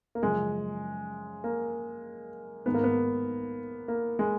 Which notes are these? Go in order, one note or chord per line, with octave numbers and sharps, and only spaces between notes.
A#3
F#2 C#3 F3 G#3
A#3
G#2 D#3 B3
A#3
B3
A#3
G#3